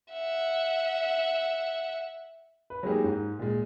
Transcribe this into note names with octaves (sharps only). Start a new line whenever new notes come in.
E5 F#5
B4
F#3 G#3 A#3 D#4 G4 G#4
G#2
A#2 G#3